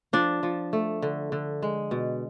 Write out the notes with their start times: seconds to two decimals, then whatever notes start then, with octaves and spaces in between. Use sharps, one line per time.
0.13 F3 D4
0.43 F3
0.73 A3
1.02 D3
1.32 D3
1.62 G#3
1.91 B2